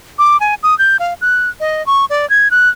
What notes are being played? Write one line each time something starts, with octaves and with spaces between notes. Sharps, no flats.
D6
G#5
D#6
G6
F5
F#6
D#5
C#6
D5
G#6
F#6